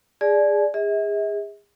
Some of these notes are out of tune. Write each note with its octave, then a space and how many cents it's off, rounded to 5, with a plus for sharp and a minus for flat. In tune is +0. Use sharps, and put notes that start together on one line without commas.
G#4 -15 D5 +0 G#5 +45
G#4 -30 E5 -45